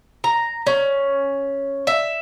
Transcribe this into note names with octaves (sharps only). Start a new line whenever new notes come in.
A#5
C#4
E5